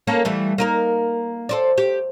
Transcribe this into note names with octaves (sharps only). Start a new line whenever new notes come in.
A#3 C#4 A4
E3 G3 A3
A#3 D#4 A#4
A4 C5 D5
G4